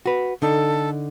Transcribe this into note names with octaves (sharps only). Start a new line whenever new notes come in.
F#4 B4
D3 D#4 A4